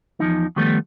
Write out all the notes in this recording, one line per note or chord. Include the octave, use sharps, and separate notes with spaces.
E2 F3 D#4
D#3 F3 G3 A3 B3